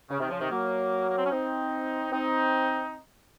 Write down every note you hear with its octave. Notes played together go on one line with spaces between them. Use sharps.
C#3
C3 D#3
C#3 F3
C3 D#3
F#3 A#3
A#3
C4
C#4
C4 D#4
C4 D#4